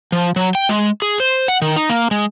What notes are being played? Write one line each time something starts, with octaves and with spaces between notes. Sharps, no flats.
F3
F#3
G5
G#3
G#4
C5
F#5
D#3
D#4
A#3
G#3